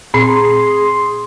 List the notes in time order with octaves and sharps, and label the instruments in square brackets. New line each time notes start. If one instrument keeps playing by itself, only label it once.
[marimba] A#2 C4 [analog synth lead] G#4 [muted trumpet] C6